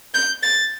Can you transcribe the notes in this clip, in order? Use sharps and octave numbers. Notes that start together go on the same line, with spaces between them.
G6
A6